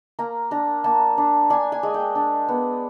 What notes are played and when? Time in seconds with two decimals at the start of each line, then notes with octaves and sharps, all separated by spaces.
0.19 A#3 A#5
0.51 D4 A#5
0.84 A#3 A5
1.18 D4
1.50 D4 G#5
1.72 G#5
1.83 G#3
1.94 G5
2.15 D4
2.48 B3